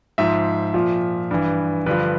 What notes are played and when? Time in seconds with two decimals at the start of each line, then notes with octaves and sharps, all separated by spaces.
0.18 G#2 F3 E5
0.74 A#2 F3
1.31 G2 E3
1.86 G2 D3 F3 B4